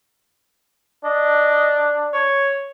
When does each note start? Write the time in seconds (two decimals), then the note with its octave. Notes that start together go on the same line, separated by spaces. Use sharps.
1.04 D4 D#5
2.13 C#5